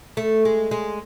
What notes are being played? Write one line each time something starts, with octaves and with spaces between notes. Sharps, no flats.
A3
G#3
G#3